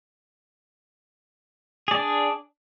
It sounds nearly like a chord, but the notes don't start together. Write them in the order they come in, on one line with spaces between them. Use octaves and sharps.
G#4 D5 D4